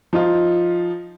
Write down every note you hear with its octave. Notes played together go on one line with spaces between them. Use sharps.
F3 D#4 F4